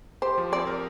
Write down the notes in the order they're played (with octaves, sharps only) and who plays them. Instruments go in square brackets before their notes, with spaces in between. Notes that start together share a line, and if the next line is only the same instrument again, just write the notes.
[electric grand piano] G4 [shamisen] C5
[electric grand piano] F3
[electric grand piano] C4 [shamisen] D5
[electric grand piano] A#4